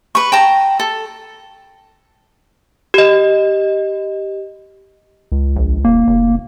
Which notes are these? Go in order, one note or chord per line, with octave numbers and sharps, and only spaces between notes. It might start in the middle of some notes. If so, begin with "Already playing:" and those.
B4 C#6
G5 A5 A#5
A4
G4 D#5
C#2
A#1
D#1 A#3
F1